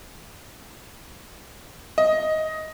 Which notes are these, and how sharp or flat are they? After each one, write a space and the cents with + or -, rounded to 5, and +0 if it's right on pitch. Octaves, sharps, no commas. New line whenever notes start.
D#5 +10